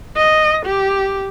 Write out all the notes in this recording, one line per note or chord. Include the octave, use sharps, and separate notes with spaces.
D#5
G4